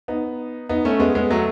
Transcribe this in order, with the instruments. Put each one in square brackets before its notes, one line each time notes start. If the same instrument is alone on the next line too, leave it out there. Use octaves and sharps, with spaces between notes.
[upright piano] B3 D#4
B3 D#4
A3 C#4
G#3 B3
G#3 B3
F#3 A3